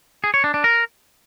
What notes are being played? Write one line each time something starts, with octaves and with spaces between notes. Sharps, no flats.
G#4
C#5
D4
D4
A#4